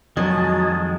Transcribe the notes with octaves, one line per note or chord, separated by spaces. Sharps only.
F2 D#3 F#3 G#3 D#5 G#5 A5